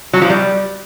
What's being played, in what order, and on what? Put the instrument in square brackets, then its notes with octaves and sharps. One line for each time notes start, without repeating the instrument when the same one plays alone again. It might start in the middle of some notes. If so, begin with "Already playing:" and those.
[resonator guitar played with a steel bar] F#3
F3
G3